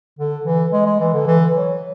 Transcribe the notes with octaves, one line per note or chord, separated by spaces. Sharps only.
D3
E3
G#3
G#3
E3
D3
E3
F#3